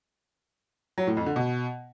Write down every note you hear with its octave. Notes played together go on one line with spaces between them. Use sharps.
F#3
A2
F2
D3
B2